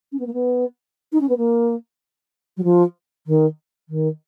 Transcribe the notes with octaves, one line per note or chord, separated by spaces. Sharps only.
C#4
B3
A#3
B3
D#4
C#4
B3
A#3
F#3
F3
D#3
D#3